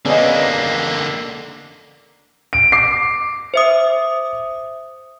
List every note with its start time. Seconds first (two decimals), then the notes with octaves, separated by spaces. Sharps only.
0.05 D3 A#3 B3 C#4 G#4 D5 D#5
2.53 D7
2.72 D6 C7
3.54 C5 E5 D#6